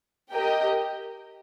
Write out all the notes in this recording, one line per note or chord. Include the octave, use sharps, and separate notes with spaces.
G4 A#4 D#5 G5